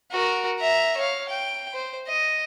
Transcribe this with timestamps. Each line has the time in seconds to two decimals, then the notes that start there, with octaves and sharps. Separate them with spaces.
0.11 F#4 A#4
0.59 E5 A#5
0.97 C#5 F5
1.29 G5
1.74 C5
2.08 D#5